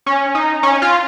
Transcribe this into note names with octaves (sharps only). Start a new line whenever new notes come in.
C#4
D#4
C#4
F4